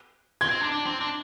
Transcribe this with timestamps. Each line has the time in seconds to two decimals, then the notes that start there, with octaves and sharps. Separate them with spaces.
0.41 C4 G#6
0.51 C4
0.61 D4
0.72 D4
0.86 C4
1.01 D4